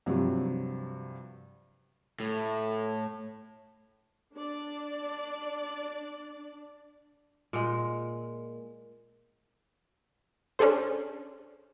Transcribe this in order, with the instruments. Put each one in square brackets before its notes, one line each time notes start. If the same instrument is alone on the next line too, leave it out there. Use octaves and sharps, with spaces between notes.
[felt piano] G2 C3 F3 F#3
[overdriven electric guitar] A2 [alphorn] A3
[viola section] D4 D5
[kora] A#2 G#3
[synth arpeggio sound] C#4 D4 G#4 A4 C5